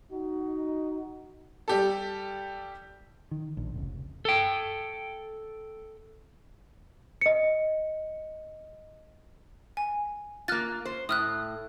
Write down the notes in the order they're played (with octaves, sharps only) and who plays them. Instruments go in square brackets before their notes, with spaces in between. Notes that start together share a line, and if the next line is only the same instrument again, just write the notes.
[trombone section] D#4 F#4
[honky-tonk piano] G3 G4 A4
[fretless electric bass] D#3
A#1
F1 C#2
[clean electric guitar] A4 G5
[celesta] D#5 C#7
[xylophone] G#5
[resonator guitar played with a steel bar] A#3 F4 [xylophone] F6 F#6 A6
[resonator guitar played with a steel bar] C5
[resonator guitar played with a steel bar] A2 [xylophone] D#6 F6 F#6